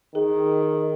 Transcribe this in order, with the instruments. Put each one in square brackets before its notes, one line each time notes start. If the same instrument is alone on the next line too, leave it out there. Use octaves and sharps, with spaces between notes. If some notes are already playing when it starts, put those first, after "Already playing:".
[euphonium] D#3 [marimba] G#4